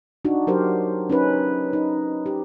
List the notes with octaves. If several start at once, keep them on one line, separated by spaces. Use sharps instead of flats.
D4 D#4 F#4
F#3 G4 A#4 C5
C#4 D#4 B4
D#4
G4